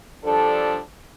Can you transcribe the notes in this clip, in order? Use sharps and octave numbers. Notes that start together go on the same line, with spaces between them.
F3 G3 D4 A4